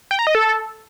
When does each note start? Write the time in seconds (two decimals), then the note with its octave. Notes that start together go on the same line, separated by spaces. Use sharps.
0.11 G5
0.19 A#5
0.27 D#5
0.35 A4